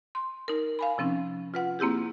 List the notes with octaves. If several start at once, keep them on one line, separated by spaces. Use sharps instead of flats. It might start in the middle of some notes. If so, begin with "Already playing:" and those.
C6
D#4 A#4
F5 G#5 B5
C3 F3 C4 C#4 D#4
F4 B4 F#5
A#3 C4 E4 G4 G#4